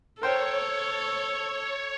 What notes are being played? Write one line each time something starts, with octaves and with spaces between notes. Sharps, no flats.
A4 A#4 C5 C#5 G5